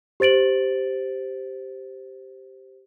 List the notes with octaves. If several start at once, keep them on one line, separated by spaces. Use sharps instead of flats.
G4 C5 A6 D7 F#7